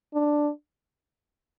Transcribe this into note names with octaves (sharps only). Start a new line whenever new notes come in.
D4